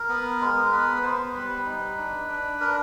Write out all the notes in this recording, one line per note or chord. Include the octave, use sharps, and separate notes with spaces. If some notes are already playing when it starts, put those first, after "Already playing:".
Already playing: A#4
B3
G#3
B3 B4
B3 C5
G3 B4
D#4
D4
D4
D4 A#4